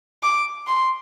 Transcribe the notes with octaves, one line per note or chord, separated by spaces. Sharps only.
D6
C6